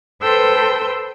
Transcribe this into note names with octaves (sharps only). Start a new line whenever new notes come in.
A4 B4 C5 G5 C6 E6